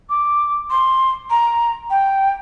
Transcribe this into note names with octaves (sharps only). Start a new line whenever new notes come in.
D6
C6
A#5
G5